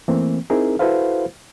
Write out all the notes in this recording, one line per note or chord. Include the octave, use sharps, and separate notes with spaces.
E3 A3 A#3 C4
C4 D#4 E4 G#4 A#4
E4 F#4 A4 B4 C5 F5